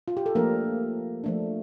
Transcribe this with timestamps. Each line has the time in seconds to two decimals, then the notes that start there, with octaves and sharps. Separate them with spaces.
0.08 F4
0.17 G4
0.26 A4
0.35 F3 A3 A#3 D4 A#4
1.24 F3 A3 D4